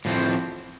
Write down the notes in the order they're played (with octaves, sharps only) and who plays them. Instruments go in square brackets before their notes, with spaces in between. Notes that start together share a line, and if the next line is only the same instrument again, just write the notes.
[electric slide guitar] A2 F3 C4